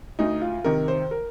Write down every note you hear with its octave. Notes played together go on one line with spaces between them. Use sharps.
D2 D#4
F4
C3 D#3 A#4
C5
A#4